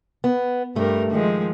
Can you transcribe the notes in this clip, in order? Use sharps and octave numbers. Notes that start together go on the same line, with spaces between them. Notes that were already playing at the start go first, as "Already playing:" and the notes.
B3
G2 A3 A#4
D#3 F3 G#3